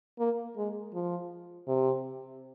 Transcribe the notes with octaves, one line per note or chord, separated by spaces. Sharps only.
A#3
G#3
F3
C3